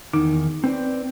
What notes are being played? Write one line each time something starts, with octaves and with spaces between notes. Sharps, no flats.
E2 D#3 D#4
C4 B4 D5